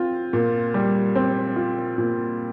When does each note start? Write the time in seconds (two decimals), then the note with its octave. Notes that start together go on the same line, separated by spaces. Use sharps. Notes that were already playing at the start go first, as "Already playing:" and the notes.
Already playing: C4 F4
0.33 A#2
0.74 G3
1.15 C4
1.56 F4
1.98 A#2